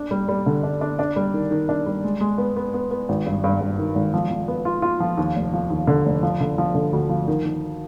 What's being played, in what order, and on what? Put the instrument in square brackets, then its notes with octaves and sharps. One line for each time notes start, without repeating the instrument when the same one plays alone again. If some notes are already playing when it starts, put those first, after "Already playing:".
Already playing: [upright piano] D4
G3
G3
D3
D4
D4
D4
G3
D#3
D#3
D4
G3
G#3
G#3
B3
B3
B3
B3
G#1
G2
G2
G2
D#3
G#1
F3
F3
B3
F4
F4
F3
D#2
F1
F3
D#2
D3
F1
F3
D3
F3
D3
D2
F3
D#3
D#3